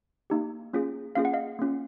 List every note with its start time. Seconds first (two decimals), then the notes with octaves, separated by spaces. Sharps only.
0.30 A#3 D#4 G4
0.73 A#3 C#4 F4 G#4
1.15 A#3 C#4 F4 G#4 F5
1.25 F#5
1.33 D#5 F5
1.59 A#3 C#4 F4